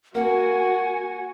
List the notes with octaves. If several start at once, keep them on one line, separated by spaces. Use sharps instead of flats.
A#3 F#4 F#5 G#5